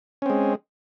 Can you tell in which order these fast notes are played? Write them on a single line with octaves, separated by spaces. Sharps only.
C#4 C4 G#3